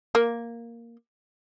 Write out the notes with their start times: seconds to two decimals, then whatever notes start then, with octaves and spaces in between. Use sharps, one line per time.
0.15 A#3